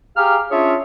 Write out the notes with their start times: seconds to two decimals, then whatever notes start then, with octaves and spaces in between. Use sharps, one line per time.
0.16 G4 G#4 F5 A#5 F6
0.51 C#4 D4 F4 G#4 C#5 E5